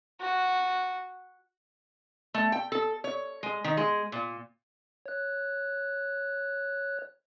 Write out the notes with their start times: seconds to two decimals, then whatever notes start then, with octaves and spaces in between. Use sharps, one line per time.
0.20 F#4
2.34 A3
2.52 G5
2.72 A4
3.04 C#5
3.43 G#3
3.64 D#3
3.77 G#3
4.12 A#2
5.06 C#5 F#6